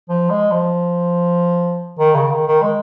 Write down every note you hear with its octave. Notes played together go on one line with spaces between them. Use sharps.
F3
G#3
F3
D#3
C#3
D#3
D#3
G#3